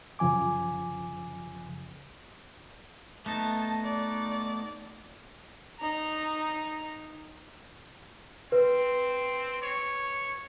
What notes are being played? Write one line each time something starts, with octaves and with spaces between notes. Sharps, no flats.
F#2 C#3 F3 G#5 D6
A3 B3 D#4 A5
D5
D#4 A#5
C4 B4
C#5